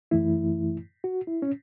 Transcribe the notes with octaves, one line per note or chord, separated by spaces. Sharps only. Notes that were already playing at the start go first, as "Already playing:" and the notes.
F#2 E3 A3 E4
F#4
E4
C#4